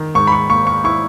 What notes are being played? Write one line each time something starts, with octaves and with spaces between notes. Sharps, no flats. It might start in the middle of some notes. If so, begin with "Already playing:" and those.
Already playing: D#3
G#2 C#6
B5
C#6
A#3 C#6
C#6
E4 C#6